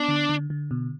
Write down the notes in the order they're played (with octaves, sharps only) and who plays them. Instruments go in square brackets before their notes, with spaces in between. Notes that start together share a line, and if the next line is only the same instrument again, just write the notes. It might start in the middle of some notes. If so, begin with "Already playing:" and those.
Already playing: [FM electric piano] B3 [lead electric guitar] D4
[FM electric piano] D3
D3
D3
B2